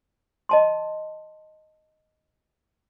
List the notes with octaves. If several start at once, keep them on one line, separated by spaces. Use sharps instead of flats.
D#5 A5 C6